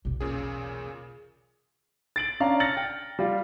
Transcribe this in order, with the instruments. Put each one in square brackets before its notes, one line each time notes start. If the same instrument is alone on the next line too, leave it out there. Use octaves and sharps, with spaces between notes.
[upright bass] B1 E2
[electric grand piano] A#2 C#3 G#4
[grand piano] A6 D7 F#7
C#4 D4 D5 F5 A5 A#5
F6 A6 A#6 C#7 F#7
G5
G3 F4